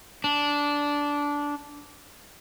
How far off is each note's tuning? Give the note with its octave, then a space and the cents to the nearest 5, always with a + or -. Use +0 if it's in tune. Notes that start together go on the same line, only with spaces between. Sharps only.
D4 -15